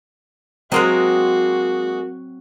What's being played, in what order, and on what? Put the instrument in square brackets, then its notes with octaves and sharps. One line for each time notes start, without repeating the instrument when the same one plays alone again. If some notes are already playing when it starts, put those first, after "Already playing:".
[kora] F#3 C4 [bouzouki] G#3 A#3 D#5 [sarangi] F#4